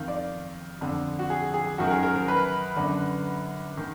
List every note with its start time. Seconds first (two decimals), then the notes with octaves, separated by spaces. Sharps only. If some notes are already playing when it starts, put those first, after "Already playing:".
Already playing: F2 D#3 F5
0.08 D5
0.81 F2 D3
1.19 F#4
1.30 G#4
1.54 G#4
1.78 F#2 D#3 F#4
1.87 A#4
1.91 G#4
2.03 A#4
2.16 A#4
2.28 B4
2.76 F#2 D3
3.77 D#3